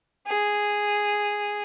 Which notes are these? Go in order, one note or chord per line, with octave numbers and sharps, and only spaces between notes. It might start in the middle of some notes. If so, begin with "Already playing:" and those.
G#4